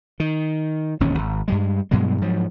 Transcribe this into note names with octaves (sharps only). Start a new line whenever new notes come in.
D#3
E1 D#2 G#2 C#4
G#1
G2 G3 G#3
G2 B2 F#3 G#3
G#2 F3 F#3